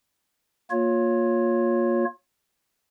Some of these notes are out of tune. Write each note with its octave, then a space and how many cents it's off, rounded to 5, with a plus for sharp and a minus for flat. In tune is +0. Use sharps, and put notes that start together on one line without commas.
A#3 +0 F4 +25 C#5 +0